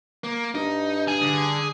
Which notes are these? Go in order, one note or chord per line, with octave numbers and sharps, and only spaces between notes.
A#3
G2 D#4
G#4
D3